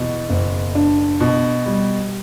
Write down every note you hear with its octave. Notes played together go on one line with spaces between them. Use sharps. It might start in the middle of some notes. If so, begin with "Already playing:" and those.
Already playing: E2 B2
F#1
D4
B2
G3